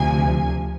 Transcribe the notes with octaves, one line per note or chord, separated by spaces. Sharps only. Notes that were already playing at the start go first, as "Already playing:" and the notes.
Already playing: D2 C3 F3 G#5